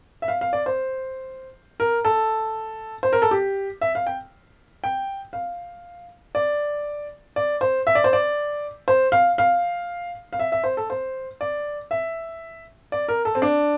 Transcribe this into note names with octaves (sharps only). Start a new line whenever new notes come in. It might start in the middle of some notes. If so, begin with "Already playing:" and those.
E5
F5
F5
D5
C5
A#4
A4
C5
A#4
A4
G4
E5
F5
G5
G5
F5
D5
D5
C5
E5
D5
C5
D5
C5
F5
F5
F5
E5
E5
C5
A4
C5
D5
E5
D5
A#4
A4
C4
D4